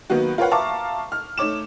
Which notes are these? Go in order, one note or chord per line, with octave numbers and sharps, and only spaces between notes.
D#3 F#3 A#3 B3 F#4
F4 A#4 B4 C#5 F5 F#5
E5 F5 A5 A#5 C#6 D6
F6
A3 D#4 C#5 D6 E7